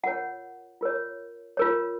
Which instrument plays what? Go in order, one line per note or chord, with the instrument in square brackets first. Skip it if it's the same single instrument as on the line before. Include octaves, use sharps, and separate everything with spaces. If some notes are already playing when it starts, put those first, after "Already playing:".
[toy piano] F4 A#4 C#5 F#5
F4 A#4 C#5
F4 A#4 C#5